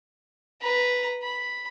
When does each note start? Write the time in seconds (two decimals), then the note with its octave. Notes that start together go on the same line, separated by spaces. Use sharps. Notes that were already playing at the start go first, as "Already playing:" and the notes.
0.61 B4 A#5
1.22 B5